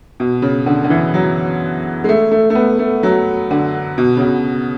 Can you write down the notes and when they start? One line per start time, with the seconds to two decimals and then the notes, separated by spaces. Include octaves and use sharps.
0.20 B2
0.42 C#3
0.66 D3
0.84 D3
0.90 E3
1.14 F#3
2.04 G#3
2.09 A3
2.32 A3
2.50 A3
2.55 B3
2.79 A3
3.03 F#3
3.51 D3
3.98 B2
4.17 C#3
4.21 B2